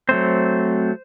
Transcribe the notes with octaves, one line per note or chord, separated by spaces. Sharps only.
F#3 A3 C4 C5